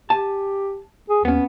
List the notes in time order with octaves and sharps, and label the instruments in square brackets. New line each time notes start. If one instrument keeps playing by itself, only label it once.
[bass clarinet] G4 [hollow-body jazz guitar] G#5 A5
[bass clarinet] G#4
[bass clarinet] D#2 [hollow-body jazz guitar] B3 C#4